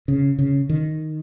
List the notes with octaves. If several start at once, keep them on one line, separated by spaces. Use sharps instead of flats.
C#3
C#3
D#3